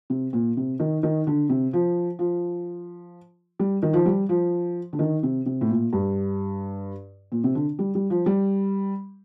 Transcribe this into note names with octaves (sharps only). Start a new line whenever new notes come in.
C3
A#2
C3
D#3
D#3
D3
C3
F3
F3
G3
D#3
F3
G3
F3
D3
D#3
C3
C3
A2
A#2
G2
A#2
C3
D3
G3
G3
F3
G3